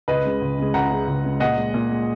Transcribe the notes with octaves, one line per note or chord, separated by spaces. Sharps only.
C#2 B4 D#5
C#3 G#3
C#2
C#3 G#3
C#2 F#5 A#5
C#3 G#3
C#2
C#3 G#3
A#2 D#5 F#5
G#3
A#2
G#3